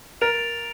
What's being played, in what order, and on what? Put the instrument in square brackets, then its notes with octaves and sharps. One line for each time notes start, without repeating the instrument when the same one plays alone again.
[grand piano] A#4 [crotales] A6 D7 F7